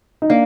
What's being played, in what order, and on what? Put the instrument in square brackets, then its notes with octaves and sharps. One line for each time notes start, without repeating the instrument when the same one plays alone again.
[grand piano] D#4
[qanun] A#3 [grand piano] D4